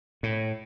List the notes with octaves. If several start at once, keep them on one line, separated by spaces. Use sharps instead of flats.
A2